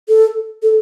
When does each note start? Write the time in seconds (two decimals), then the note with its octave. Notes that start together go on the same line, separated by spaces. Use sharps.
0.09 A4
0.63 A4